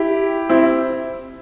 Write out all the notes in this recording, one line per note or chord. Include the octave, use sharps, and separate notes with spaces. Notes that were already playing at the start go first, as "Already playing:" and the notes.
Already playing: E4 G4
C4 E4